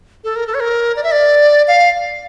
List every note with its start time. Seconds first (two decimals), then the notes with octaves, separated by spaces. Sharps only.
0.24 A4
0.36 A#4
0.47 A4
0.54 C#5
0.60 A#4
0.96 D5
1.04 E5
1.12 D5
1.68 F5